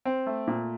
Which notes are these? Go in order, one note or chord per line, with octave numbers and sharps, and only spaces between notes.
C4
A3
A#2